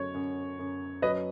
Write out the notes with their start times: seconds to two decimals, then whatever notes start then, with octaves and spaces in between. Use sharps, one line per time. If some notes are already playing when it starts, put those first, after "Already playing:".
Already playing: F#2 F#3 C#5
0.14 F#2
0.59 F#2
1.02 F#3 B4 D#5